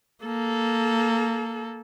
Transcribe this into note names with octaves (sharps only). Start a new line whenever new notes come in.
A#3 A4